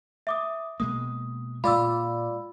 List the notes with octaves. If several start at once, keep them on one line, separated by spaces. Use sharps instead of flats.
E5 D6 D#6
B2 G#3 A#3 D#6
A#2 G#3 F4 D5 B5 E6